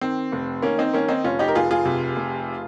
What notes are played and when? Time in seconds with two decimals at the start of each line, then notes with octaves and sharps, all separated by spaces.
0.01 D#3 C4
0.32 F1
0.62 D#3 A#3 C#4
0.78 C4 D#4
0.94 D#3 A#3 C#4
1.08 C4 D#4
1.24 F1 C#4 F4
1.39 D#4 G4
1.48 A#4
1.55 F1 F4 G#4
1.71 F4 G#4
1.85 C3
2.16 F1